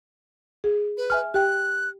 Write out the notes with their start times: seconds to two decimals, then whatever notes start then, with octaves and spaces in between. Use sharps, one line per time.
0.64 G#4
0.97 B4
1.10 E5 G#5 F6
1.34 G4 G5 F#6